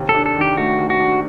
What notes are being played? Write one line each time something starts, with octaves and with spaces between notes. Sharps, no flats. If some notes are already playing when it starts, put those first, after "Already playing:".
Already playing: D#2 C3
A4
D4
A4
D#3 G4
A3 F#4
D#2
F#4
D4